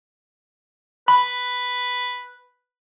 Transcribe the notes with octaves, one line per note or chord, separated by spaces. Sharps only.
B4 B5